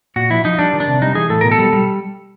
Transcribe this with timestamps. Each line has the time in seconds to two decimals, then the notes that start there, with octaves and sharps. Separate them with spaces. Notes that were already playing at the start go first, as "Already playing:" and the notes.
0.16 A#2 F#4
0.30 F3 E4
0.44 F3 D#4
0.58 G3 D4
0.73 D#3
0.80 D4
0.88 C3
1.02 G3 D#4
1.15 E3 G#4
1.29 A2 A4
1.41 B2 A#4
1.52 A4
1.58 G3
1.73 G3